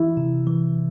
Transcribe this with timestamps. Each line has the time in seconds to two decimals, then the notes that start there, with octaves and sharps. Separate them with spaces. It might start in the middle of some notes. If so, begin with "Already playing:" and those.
Already playing: E3 E4
0.17 C3
0.47 E3